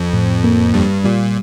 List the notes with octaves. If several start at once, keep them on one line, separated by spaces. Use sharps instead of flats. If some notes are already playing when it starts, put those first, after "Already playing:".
Already playing: F2
A2
A#3
G2 G3
A#2 G3